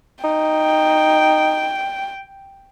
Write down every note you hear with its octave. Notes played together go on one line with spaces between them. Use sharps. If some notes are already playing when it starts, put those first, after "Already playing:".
D#4 G5